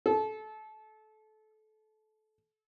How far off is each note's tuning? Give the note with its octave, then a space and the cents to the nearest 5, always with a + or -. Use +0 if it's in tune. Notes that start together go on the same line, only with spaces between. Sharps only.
A4 -25